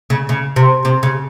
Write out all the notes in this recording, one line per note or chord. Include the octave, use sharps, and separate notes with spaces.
C#3
C#3
C3
C3
C#3